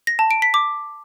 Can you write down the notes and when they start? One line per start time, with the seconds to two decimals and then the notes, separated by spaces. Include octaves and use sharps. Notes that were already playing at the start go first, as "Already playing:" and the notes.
0.07 A#6
0.19 A5
0.31 D7
0.42 B6
0.54 D6